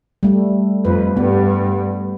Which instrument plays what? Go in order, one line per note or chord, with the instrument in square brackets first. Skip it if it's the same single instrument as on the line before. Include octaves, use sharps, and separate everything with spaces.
[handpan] G3 A3
[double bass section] F2 [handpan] B4
[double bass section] G2 [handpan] B3